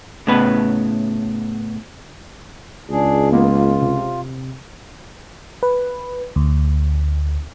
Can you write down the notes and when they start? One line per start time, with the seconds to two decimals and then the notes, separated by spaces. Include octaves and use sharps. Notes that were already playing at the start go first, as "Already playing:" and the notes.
0.27 A2 C#3 B3 B4
2.90 C#2 D4 G#4
3.32 G#3 A#3 B3 F4
3.82 C3
5.63 B4
6.36 D2